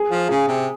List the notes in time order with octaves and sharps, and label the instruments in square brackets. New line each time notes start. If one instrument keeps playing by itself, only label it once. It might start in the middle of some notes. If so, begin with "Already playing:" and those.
Already playing: [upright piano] G#4
[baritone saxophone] F3
[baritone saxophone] C#3 [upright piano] G#4
[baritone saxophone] C3